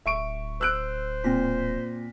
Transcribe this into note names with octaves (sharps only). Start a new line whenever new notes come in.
D1 E5 C#6 D7
C5 E6 F#6 D7
A#2 C4 A#6 B6